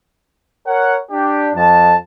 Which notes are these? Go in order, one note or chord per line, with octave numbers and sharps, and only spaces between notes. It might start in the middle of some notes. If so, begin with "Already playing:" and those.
A#4 C#5 F#5
D4 G4
F2 A5